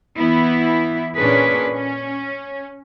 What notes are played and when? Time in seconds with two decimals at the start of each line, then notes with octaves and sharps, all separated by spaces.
0.18 E3 B3 E4
1.16 A#2 C#4 D4 G#4 B4
1.72 C#4